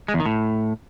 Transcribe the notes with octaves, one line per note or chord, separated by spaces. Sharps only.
G#3
E2
D#3
A2